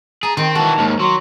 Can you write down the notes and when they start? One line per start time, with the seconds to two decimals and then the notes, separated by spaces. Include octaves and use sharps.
0.23 G#4 A5 A#5
0.37 D#3 C4 G5
0.55 E3 F#4 A4 A5
0.78 D#2 G#2
0.99 F#3 C6